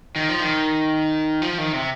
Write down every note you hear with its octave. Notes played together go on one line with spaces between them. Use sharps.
D#3
F3
D#3
F3
D#3
C3